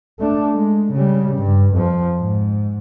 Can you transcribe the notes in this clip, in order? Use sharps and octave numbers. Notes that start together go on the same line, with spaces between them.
A3 D4
G#3
C#3 G3
G2
F2 F3
G#2